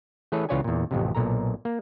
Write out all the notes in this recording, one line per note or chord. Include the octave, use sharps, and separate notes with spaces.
E3 A3 G#4 A4 B4 C#5
C#2 E3 F4 C#5 D5 G#5
E2 A#2
A1 F2 C3
B1 A#2 A4 A#5
A#3